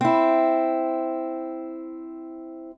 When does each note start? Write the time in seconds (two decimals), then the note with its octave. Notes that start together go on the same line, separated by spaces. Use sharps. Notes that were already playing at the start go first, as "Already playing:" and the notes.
0.01 C4 E4